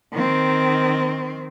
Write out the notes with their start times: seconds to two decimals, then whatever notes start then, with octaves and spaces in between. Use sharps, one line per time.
0.13 D#3 C4